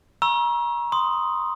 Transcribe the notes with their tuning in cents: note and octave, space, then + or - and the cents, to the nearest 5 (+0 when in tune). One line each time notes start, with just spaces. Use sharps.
A#5 +35 C#6 -25 E6 +0
C6 -5 D#6 +0